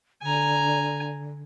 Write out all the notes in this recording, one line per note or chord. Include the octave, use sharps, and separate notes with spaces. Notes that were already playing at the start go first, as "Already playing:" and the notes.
D3 G#5 A#5